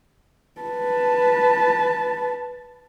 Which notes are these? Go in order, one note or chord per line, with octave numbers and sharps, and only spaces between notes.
B4 A5